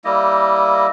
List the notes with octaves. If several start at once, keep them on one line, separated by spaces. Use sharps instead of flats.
G3 A#3 E4 D#5